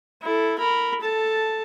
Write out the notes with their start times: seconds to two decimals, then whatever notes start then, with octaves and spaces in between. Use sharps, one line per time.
0.22 E4 A4
0.58 A#4 B5
1.01 A4 A5